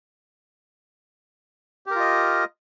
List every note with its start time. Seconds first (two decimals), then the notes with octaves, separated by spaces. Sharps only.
1.86 G4
1.91 A#4
1.95 F4
2.00 D#5